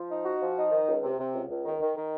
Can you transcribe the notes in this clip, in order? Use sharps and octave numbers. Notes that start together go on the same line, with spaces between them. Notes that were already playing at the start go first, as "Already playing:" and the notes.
Already playing: F3
D#4
F#4
F3
D#4
D#3
C#2
C3
C3
C#2
C#2
D#3
D#3
D#3